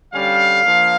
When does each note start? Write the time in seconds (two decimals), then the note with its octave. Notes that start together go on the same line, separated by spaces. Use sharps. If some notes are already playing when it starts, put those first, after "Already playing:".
0.14 D3 G3 C#4 F5
0.65 F3 A#3 D4